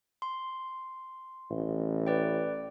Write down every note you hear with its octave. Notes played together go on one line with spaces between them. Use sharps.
C6
A1
B4 D5 G5